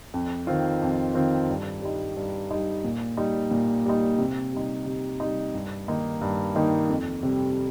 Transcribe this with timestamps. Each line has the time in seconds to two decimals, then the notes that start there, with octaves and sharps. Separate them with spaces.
0.14 F2
0.47 D#3 C4 F4
0.82 F2
1.15 D#3 C4 F4
1.50 G2
1.82 G3 D#4
2.17 G2
2.51 G3 D#4
2.85 A#2
3.17 G3 D#4
3.51 A#2
3.86 G3 D#4
4.18 C3
4.52 G3 D#4
4.86 C3
5.20 G3 D#4
5.54 G2
5.88 D#3 A#3 D#4
6.21 G2
6.56 D#3 A#3 D#4
6.89 F2
7.23 C3 G3